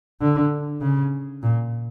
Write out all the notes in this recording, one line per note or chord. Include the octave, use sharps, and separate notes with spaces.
D3
C#3
A#2